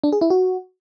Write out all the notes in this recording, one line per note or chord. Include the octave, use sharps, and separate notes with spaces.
D4
G#4
E4
F#4